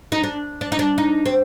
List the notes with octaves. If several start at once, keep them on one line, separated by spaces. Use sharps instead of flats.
D#4
D4
D4
D#4
D4
D#4
C4